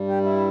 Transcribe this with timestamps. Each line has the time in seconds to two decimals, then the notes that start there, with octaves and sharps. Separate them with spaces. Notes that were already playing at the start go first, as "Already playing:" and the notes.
Already playing: G2 G3
0.08 G4
0.23 E4